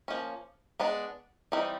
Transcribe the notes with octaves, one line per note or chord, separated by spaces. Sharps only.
F3 A#3 C#4
G#3 B3 D4
E3 G3 C4 D#4